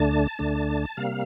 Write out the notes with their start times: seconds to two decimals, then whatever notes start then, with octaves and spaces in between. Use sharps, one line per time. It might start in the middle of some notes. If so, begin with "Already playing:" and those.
Already playing: D2 D3 A3 D4 A5
0.39 D2 D3 A3 D4
0.97 C3 G3 A#3 F5